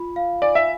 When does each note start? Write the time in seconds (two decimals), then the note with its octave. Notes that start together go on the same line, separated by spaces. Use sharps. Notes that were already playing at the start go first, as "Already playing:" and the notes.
Already playing: F4 B5
0.16 F5
0.42 D5 G#5
0.55 E5